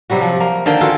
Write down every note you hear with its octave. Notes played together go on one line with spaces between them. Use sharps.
C3 F#3 G3 F#4
F3
A#3
D3 D#3 A#3 G5
F4 F#4 G#4 A4